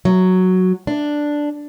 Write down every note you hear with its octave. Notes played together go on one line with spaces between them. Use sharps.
F#3
D4